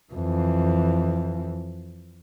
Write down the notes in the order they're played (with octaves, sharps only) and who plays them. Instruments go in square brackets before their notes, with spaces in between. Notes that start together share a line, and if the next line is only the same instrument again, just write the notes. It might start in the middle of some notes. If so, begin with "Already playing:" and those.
[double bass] F2 E3